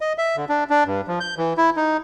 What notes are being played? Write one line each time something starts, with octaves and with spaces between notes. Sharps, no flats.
D#5
E5
D3
D4
D4
G2
F3
G6
E3
E4
D#4